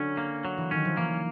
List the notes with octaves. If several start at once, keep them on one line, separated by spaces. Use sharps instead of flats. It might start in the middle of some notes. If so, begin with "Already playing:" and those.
Already playing: D3 F#3 C#4
A#3
F#3
E3
D#3 C#4
F3
E3 A#3